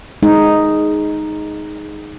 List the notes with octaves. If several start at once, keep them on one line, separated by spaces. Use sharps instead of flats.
G#3 D#4